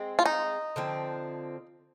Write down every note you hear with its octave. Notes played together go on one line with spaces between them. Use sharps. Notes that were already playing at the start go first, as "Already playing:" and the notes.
Already playing: G#3 C4
F4
D#4
D3 F3 C4